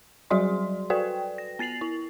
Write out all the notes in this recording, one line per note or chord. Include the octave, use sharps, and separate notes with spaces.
F#3 G3 F#4 G#4 D5 C6
F#4 A4 B4 D5 G5
A#6
B3 A6 C7 F7 F#7
E4